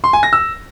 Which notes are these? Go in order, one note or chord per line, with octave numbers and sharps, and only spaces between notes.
C6
G#5
A#6
E6